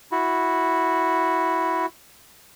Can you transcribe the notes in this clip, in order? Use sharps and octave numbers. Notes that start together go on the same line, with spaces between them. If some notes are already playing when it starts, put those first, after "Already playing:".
E4 F#4